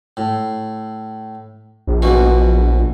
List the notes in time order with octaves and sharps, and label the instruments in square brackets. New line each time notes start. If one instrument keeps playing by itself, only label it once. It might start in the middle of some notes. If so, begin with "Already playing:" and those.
[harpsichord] A2
[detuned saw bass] A#1
[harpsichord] B2 E3 F#4